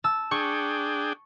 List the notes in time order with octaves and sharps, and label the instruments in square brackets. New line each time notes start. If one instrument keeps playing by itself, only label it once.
[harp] A5 E6
[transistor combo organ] D4 G#4 G5 [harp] C#6